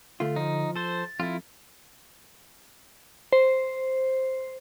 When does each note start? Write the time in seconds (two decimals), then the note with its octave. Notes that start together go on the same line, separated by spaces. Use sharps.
0.20 D3 A3 F4
0.36 F3 D#4
0.76 A4 C5 A6
1.20 F2 E4 F4
3.33 C5